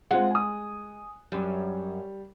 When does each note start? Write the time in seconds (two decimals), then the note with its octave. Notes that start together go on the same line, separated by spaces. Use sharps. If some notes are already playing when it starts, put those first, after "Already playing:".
0.11 G#3 C4 F4 F#5
0.31 G#5 D#6
1.32 F#2 G3